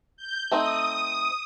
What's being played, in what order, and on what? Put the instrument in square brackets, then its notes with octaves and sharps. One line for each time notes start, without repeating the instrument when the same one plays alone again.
[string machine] G6
[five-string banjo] A3 C4 D#4 [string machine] D#6